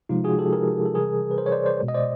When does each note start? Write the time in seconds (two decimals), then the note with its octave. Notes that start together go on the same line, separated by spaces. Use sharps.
0.09 C3 F3 G#3 D#4 F4
0.24 F#4 G#4
0.38 G4 A4
0.53 G#4 A#4
0.86 A4
0.95 C3 E3 G3 G#4 A#4
1.31 B4
1.38 A#4 C5
1.46 C#5
1.52 C5 D5
1.66 C5 D5
1.81 B2 G#3
1.88 D#5
1.94 C5 D5